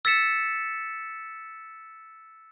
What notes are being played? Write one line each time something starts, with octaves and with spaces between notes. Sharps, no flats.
E6 A6 B6 C#7 E7